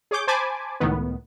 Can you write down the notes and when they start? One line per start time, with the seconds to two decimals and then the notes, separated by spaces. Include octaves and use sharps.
0.11 G#4 C#5 D6 G6
0.27 C5 G#5 A5 B5 D6
0.80 C#2 A2 D#3 B3